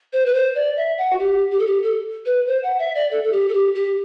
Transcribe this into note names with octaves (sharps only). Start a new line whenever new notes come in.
C5
B4
C5
D5
E5
F#5
F#4
G4
G4
A4
G4
A4
B4
C5
F#5
E5
D5
A4
A4
G4
A4
G4
G4